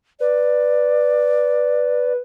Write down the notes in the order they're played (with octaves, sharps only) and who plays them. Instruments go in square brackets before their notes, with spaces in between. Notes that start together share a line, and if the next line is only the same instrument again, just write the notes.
[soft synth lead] B4 [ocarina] D5